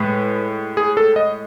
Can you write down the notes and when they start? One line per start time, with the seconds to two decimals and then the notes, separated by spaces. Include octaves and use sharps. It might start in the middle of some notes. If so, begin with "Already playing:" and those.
Already playing: A2 G#3 B4
0.77 G#4
0.97 A4
1.16 D#5